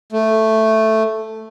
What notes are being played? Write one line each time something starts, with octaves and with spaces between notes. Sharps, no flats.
A3